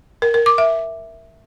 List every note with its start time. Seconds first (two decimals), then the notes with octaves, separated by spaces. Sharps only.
0.22 A#4
0.34 A#4
0.46 D6
0.58 E5